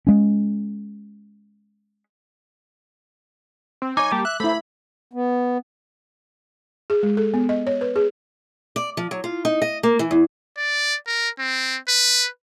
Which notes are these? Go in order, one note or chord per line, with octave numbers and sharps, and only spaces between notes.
G#3 C#4
C4
D#4 C#5 G#5 D6
G3 A#3 G4 A5
E5 F#6
A3 E4 A4 C5 B5
B3
G#4
G#3
A4
B3
D#5
C#5
B4
G#4
D5
F3
F#3
F4
D#4
D#5
A#3
E3
E2
D5
A#4
C4
B4